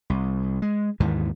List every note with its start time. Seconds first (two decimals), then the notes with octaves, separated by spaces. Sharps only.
0.10 C2
0.62 G#3
1.00 D#2 G#2 D#3 E3